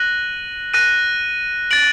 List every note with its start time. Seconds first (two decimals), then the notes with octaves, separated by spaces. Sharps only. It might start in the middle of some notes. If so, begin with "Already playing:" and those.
Already playing: F#6 A#6 D#7 F#7
0.74 F#6 A#6 D#7
1.71 A6 D7 F#7